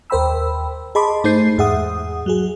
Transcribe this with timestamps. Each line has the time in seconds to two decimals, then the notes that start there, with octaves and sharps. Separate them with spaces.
0.10 D#2 A#4 C5 G5 B5 E6
0.95 G#4 D#5 A5 B5 C6 D6
1.24 G#2 A3 D#4 C5 G6 C7
1.58 E2 G#2 G#4 E5 F#5 D#6
2.26 F#3 F#4 G#4